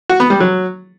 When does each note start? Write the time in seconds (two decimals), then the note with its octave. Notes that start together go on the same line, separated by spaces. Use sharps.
0.09 F#4
0.20 B3
0.30 G3
0.40 F#3